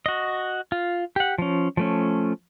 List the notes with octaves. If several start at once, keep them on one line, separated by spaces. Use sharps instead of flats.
F#4 D#5
F4
G4 F#5
F3 C#4
F3 A3 C#4